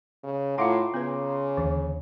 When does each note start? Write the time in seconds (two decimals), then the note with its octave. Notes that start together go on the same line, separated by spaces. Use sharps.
0.24 C#3
0.58 A2 F4 F5 F#5 A#5 C6 D6
0.94 C#3 B3 B4
1.57 D#2 D3 E3